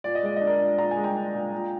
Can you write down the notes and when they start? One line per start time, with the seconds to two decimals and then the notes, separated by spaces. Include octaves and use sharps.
0.04 A#2 D5
0.15 D#5
0.23 G#3 D5
0.36 D4 D#5
0.47 A#4 D5
0.60 A#2
0.78 A#2 A#5
0.91 G#5
0.97 G#3
1.04 G5 A#5
1.15 D4
1.34 A#2
1.52 A#2